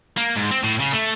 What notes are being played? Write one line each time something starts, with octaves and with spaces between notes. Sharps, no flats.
A#3
G#2
C4
A2
C#3
A3